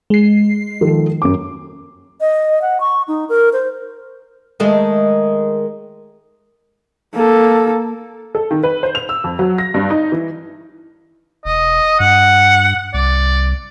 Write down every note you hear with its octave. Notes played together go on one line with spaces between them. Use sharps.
G#3 C7
D#3 F3 A4
F#2 D6
D#5
F#5
C#6
D#4
A#4
C5
D#3 G#3 A3
A#3 A4
A4
D#3
B4
C5
F7
E6
F2
F#3
A#6
G2
D#4
E3
E1 D#5
G2 F#5
C2 D5